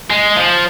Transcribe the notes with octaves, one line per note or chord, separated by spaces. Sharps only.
G#3
F3